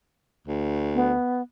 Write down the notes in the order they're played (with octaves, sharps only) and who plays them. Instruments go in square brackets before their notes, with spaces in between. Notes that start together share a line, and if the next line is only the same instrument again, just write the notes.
[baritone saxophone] D2
[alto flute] B3